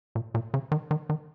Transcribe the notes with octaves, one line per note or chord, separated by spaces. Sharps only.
A#2
A#2
C#3
D#3
D#3
D#3